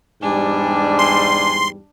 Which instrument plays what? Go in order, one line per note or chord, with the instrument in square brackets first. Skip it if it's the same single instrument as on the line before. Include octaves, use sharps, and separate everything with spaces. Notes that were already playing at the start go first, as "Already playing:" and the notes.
[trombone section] E2 G#2 G3 [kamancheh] D4 G#5
[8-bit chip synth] C6